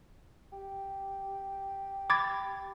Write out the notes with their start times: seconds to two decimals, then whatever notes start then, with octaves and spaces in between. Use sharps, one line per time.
0.52 G4
2.10 B5 D6 G#6 A6